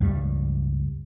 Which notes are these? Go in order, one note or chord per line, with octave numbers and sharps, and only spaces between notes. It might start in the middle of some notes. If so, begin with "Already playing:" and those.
C#2 G2 G3